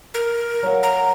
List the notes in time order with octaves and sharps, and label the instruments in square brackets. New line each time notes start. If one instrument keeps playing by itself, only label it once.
[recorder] A#4
[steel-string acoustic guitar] F#3 F5 F#5
[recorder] A#5